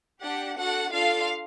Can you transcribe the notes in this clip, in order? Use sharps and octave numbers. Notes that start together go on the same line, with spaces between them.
D4 G4 F#5
D4 F#4 A4 F#5
D4 F4 A4 F5